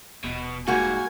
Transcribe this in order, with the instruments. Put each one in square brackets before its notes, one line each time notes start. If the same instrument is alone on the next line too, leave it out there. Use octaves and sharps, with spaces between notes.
[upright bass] D#1 E2 [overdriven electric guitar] B2
[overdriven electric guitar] G#2 [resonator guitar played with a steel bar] G3 A#3 F#4 [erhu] G#5